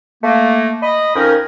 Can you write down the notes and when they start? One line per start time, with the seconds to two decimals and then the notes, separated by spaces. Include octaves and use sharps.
0.24 A3 A#3
0.83 D#5 B5
1.16 F2 C#4 D#4 A#4